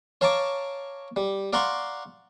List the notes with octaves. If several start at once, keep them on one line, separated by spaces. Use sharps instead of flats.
C#5 F5 A5 A#5 C#6 D6
G3
D5 F5 F#5 A#5 C6 C#6